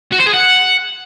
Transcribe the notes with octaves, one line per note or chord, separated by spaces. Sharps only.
F#4
C5
G#4
F#5